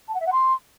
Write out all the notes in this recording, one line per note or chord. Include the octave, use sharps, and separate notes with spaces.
A5
F#5
E5
F#5
C6